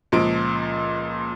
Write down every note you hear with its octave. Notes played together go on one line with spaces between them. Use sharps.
C#2 A#2 F3 D7